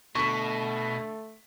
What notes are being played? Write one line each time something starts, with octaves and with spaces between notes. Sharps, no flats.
B2 D3 A3 A5 B5 C#6 B6